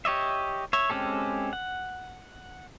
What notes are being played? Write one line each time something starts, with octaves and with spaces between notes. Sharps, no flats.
G4 C#5 D#5 E5
C#5 E5
G#3 C4 C#4 G4 A4
F#5